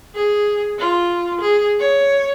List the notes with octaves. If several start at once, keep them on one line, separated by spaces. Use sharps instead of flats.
G#4
F4
G#4
C#5